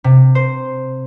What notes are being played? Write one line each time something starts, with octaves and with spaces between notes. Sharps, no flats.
C3
C5